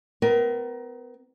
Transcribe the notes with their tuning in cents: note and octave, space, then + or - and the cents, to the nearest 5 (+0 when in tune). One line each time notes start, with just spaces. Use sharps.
B3 +40 A#4 +20